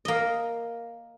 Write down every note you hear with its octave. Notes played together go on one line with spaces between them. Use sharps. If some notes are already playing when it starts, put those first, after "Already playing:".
A#3 D#5